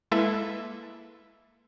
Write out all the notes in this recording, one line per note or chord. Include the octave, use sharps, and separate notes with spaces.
G#3 A#3 E4 A4 B4 E5